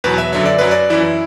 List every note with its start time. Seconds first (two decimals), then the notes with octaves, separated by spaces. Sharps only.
0.04 E2 B2 F#3 B4
0.18 E5
0.32 F#2 D3 F#3 E5
0.46 D5
0.59 F#2 F#3 B4
0.71 D5
0.90 F#2 E3 E4